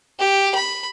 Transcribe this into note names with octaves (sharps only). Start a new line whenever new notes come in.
G4
B5